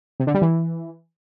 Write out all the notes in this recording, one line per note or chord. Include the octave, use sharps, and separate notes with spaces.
C3
D3
G3
E3